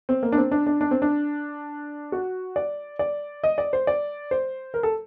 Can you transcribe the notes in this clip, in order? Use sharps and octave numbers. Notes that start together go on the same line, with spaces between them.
C4
A#3
D4
C4
D4
D4
D4
C4
D4
F#4
D5
D5
D#5
D5
C5
D5
C5
A#4
A4